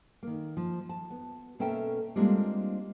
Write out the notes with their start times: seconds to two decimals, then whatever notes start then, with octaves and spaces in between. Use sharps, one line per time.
0.23 D#3 A#3
0.57 F3
0.89 A5
1.10 B3
1.59 B2 A#3 C#4 A4 E5 G5
2.16 G3 G#3 A#3 C4 D4 F4